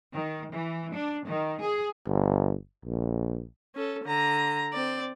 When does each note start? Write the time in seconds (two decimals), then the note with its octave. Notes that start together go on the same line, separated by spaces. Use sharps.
0.13 D#3
0.51 E3
0.93 D4
1.26 D#3
1.61 G#4
2.06 G1
2.85 A#1
3.75 C#4 A4
4.05 D3 A#5
4.73 C4 D5